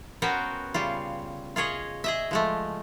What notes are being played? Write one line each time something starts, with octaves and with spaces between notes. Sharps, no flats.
B3 C#4 F#4 A#4 C5 G5
C#3 G3 F4
F4 G#4 C#5 D#5
G#4 D#5 E5
F3 G#3 A3